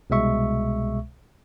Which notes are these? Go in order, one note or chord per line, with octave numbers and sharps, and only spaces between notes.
C2 B2 G#3 E5 C#6